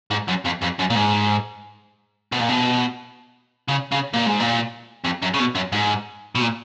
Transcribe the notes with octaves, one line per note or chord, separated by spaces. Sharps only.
G#2
F#2
F2
F2
F#2
A#2
G#2
B2
A#2
B2
C#3
C#3
A#2
G#2
A#2
F2
F#2
C#3
B2
F#2
G#2
B2
A#2